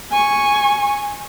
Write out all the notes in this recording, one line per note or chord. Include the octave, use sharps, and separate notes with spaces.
G#5 C#6